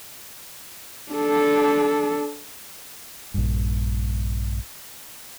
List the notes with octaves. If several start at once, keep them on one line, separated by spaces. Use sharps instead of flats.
D4 A4
A#1 G2